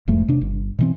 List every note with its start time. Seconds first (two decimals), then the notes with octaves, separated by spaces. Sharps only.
0.08 E1 F2 G#2 A3
0.28 C3 D4
0.41 G1
0.79 B2 E3 C4